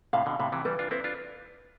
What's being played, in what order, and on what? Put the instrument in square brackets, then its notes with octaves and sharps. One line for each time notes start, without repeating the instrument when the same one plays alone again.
[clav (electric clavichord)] A2 C3 [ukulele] F5
[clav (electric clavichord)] B2 D3
[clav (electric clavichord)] A2 C3 [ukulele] B5
[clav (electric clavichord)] C3 E3
[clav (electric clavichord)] E3 G3 [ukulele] B4
[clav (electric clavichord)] D4 F4
[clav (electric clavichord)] C4 E4 [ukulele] B4
[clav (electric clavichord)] D4 F4